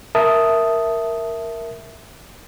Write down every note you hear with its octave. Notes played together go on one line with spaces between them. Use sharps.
A#4 E5 A5 D#6